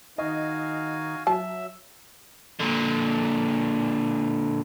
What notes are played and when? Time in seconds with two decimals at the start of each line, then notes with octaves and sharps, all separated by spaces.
0.18 D#3 D#4 F#4 D#5 F5 G#5
1.27 F#3 E5 A5
2.60 A#2 D3